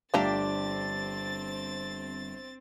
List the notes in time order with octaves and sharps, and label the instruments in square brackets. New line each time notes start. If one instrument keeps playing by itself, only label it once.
[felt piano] G1 [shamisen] F3 A3 A#5 [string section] C4 A6 [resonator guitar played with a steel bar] D4 G4